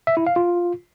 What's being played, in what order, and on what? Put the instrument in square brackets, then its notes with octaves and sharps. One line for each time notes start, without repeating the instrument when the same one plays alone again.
[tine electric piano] E5
E4
F5
F4